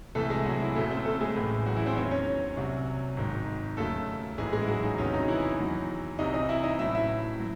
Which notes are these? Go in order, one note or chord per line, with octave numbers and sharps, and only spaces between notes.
C2 C3 E3 A3 A4
G#3 G#4
F#3 F#4
E3 E4
F#1 F#2 C#3 A3 A4
C4 C5
A3 A4
G#3 G#4
A1 A2 E3
F#3 F#4
E3 E4
C4 C5
E2 D#3 F#3 C#4 C#5
C#4 C#5
C2 C3 F#3
G#1 G#2 D#3
D#2 C#3 F#3 A3 A4
A1 G#2 E3 G#3 G#4
G#3 G#4
E4
F#3 F#4
D#4
E1 E2 C3 D#3 F#3 C#4
D#4
E3 E4
E2 D#3 F#3
C2 C3 E3 D#4 D#5
D#4 D#5
E4 E5
D#4 D#5
A1 A2 F#3 E4 E5
E4 E5
F#3